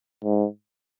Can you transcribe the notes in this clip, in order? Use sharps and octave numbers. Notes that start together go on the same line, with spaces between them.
G#2